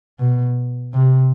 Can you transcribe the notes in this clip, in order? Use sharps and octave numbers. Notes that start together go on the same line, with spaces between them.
B2
C3